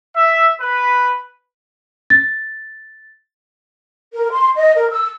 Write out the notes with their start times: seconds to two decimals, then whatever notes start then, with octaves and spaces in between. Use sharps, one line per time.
0.16 E5
0.61 B4
2.10 A6
4.13 A#4
4.32 C6
4.57 D#5
4.76 A#4
4.91 E6